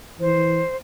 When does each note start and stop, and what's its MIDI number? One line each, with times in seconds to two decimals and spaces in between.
0.21 0.62 52
0.21 0.76 72